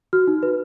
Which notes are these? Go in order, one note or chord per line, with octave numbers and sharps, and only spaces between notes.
F#4 F6
D#4
B4